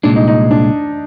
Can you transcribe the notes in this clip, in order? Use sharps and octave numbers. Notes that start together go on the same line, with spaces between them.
C2 A#2 G#3 D4
D#4
D#4
D4